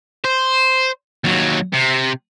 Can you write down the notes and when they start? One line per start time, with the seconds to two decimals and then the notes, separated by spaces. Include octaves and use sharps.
0.24 C5
1.24 D#2 F#3
1.74 C3